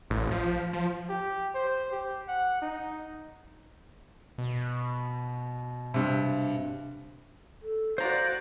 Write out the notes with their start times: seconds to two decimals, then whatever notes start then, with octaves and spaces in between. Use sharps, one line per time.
0.10 A1
0.31 F3
0.73 F3
1.10 G4
1.55 C5
1.92 G4
2.28 F#5
2.62 D#4
4.38 B2
5.94 G2 C3
7.63 A4
7.98 F#4 C5 D5 F5 A#5